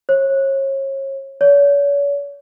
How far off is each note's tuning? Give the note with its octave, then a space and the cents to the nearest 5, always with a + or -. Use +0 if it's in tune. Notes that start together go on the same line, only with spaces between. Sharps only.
C#5 -35
C#5 +40